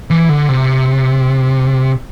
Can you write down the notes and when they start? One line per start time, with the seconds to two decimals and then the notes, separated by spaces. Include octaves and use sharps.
0.10 E3
0.29 D3
0.49 C3